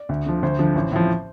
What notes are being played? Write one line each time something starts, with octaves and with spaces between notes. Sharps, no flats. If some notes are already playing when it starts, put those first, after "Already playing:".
Already playing: D5
D2
D3 F3
D2 C5
D3 F3
A1
A2 F3